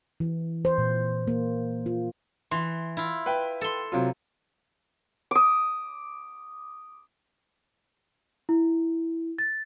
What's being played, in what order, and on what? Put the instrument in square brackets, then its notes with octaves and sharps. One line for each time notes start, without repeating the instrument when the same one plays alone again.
[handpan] E3
C5
A#2
A#3
F4
[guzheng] E3 [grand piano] C6
[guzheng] E4 F4
[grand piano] B4 E5 G5
[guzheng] A4 C6
[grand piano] C3 F#3 F4
[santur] D6 D#6
[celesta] E4
A6